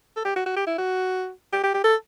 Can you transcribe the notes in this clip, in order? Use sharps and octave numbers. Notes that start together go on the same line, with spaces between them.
A4
G4
F#4
F#4
G4
E4
F#4
G4
G4
G4
A4